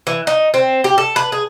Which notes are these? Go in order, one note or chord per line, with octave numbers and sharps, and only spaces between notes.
E3
D#4
C4
G4
A4
B4
G#4